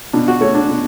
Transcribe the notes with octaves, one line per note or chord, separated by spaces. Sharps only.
B2 D4
F#4
A3 C#5
D4
B2